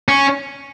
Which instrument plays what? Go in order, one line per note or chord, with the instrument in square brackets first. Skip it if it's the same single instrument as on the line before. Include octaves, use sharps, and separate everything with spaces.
[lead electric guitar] C#4